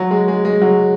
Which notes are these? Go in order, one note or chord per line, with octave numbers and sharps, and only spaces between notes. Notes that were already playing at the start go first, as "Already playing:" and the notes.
Already playing: F#3
G#3
G#3
G#3
F#3